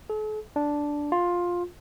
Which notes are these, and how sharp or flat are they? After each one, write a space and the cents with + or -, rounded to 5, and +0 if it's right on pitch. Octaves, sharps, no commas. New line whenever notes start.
A4 -45
D4 -5
F4 +10